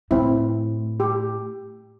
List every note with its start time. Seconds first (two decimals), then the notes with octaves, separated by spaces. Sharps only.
0.11 A2 C4 E4
1.00 G4